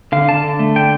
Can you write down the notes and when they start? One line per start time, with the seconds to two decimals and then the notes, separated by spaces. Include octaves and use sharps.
0.12 D3 F5
0.28 D3 A5
0.44 D3
0.59 A3
0.76 D3 G5